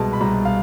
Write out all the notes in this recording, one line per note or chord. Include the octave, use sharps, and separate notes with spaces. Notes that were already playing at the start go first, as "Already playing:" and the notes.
Already playing: C2 B2 G#3 A5
B5
C2 A#5
F5